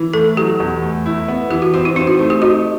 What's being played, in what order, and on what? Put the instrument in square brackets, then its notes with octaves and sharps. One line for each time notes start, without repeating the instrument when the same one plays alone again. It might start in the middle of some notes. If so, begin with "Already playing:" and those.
Already playing: [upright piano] E3
[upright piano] A3 [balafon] A4
[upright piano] F#3 [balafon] G4
[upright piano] E2
A3
E4
B3
[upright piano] E3 [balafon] G4
[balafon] F#4
[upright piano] C4 [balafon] F#4
[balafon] E4
[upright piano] C4 [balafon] D#4
[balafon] F#4
[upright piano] A3
[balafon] G4
[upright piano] D#4 [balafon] F#4